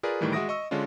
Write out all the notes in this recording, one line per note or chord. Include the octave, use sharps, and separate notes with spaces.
F4 G#4 A#4 B4 D5
A2 D#3 E3 G3 A3
G#3 F#4 E5 D#6 A#6 D7
D#5 C#6 E6
D3 G#3 C#4 D4 F4